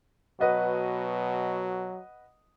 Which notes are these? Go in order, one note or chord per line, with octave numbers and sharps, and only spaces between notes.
B2 F#3 B4 D#5 F#5